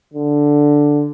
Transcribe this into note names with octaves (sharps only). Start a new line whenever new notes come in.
D3